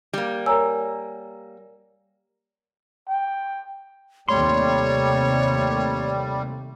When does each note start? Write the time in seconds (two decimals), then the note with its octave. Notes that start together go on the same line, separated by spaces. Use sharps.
0.13 G3 A#3
0.46 A#4 C#5 F#5 G#5 A#5 E6
3.08 G5
4.29 D#2 C3 G3 A3 C#5 C6